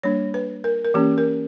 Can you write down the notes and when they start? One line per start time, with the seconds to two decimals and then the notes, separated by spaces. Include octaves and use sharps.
0.03 G3 A#3 D4 C#5
0.34 B4
0.64 A#4
0.85 A#4
0.94 E3 A#3 C#4 G4
1.18 A#4